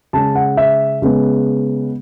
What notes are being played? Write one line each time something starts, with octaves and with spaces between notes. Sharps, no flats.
C#3 G#3 C#4 A5
F#5
E5
C#3 G#3 B3